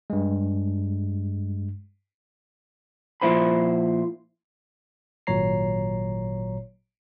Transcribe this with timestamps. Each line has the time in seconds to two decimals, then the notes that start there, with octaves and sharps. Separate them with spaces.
0.10 G2 G#3
3.22 A#2 F3 E4 C5 B5
5.27 G#1 A#2 F#3 C#5 A#5 C7